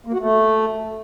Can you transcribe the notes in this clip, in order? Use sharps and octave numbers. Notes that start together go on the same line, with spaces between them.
A#3
F#4
A3